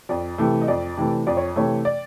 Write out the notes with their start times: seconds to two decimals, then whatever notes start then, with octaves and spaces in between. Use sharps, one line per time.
0.09 F2 D5
0.38 C3 E3 A3
0.62 D#5
0.68 F2 D5
0.97 C3 E3 A3
1.27 F2 D5
1.37 C#5
1.56 C3 E3 A3 C#5
1.85 D5